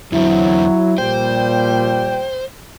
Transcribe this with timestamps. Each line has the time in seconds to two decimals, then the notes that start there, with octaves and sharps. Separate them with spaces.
0.12 E2 D3 F#3 C4 E4
0.98 A#2 F3 G3 C5 G5